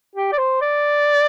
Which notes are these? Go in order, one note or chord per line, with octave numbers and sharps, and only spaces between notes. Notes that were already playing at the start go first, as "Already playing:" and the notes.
G4
D5
C5
D5